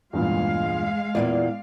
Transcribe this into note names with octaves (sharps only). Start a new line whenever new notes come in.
E2 G2 A#2 G#3 F5
E2 A#2 A#3 D5